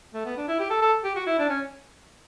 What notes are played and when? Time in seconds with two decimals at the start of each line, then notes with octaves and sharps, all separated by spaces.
0.14 A3
0.25 B3
0.37 D4
0.48 E4
0.59 G4
0.70 A4
0.82 A4
1.04 G4
1.16 F#4
1.27 E4
1.39 D4
1.49 C#4